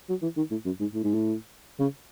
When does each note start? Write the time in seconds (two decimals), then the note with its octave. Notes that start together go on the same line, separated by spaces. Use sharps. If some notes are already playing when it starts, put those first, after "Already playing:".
0.09 F#3
0.22 E3
0.37 D#3
0.51 A2
0.66 F#2
0.80 G#2
0.94 A2
1.04 G#2
1.14 A2
1.80 C#3